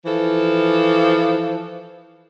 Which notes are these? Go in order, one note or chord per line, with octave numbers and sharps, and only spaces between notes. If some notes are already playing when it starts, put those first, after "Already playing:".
E3 F3 A4